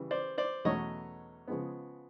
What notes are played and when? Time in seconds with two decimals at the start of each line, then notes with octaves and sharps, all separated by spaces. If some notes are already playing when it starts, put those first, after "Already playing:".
Already playing: C#3 E3 G3
0.11 C5 D5
0.38 C5 D5
0.65 E2 B2 F#3 A3 C#4 C#5 D#5
1.48 C#3 F3 G#3 B3